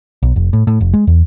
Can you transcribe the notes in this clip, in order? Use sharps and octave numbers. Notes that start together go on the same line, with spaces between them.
B1
F1
A2
A2
F1
G#3
E2